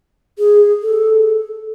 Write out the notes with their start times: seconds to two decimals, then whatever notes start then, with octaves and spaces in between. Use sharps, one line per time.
0.38 G#4
0.82 A4